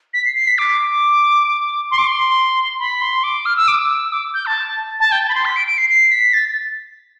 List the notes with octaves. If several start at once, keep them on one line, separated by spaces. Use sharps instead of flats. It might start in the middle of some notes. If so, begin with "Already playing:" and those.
B6
C7
C7
B6
D6
D6
C6
D6
C6
B5
C6
D6
F6
E6
D6
E6
D6
G6
A5
A5
G5
A5
B5
C6
B6
D7
D7
C7
C7
B6
A6